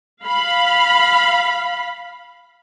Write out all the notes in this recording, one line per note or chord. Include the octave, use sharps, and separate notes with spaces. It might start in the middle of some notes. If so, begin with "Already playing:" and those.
F5 B5